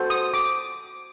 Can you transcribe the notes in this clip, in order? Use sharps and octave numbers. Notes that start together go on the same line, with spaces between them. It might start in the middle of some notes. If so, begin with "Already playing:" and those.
Already playing: F#4 A4 C5
D#6
D6